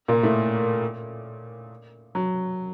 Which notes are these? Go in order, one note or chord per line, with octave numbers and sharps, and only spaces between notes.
A#2 A#3
A2 A3
F#3